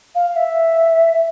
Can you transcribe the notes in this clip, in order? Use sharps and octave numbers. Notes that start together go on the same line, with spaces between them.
F5
E5